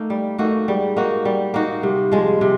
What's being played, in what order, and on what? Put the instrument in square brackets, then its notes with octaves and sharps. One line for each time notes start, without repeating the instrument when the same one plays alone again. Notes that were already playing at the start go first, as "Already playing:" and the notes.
Already playing: [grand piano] A3 [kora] A#3 D#4
[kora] G3
[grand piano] A3 [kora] A#3 D#4 F#4
[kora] G3 [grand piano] G#3
[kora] A#3 D#4 F#4
G3
A#3 D#4 F#4
[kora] C3 [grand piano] G3
[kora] F3 G#3 [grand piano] G3
[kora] C3 [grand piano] G3